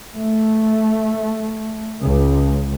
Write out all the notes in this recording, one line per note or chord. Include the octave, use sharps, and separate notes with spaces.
A3
C#2